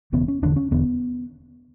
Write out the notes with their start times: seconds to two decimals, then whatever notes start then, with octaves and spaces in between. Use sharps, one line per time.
0.12 E1 E2 C#3 B3
0.28 C#4
0.42 E1 E2 D3 D4
0.56 C#4
0.71 E1 E2 D3 B3